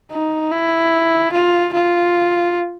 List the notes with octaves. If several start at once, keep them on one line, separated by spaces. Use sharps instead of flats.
D#4
E4
F4
F4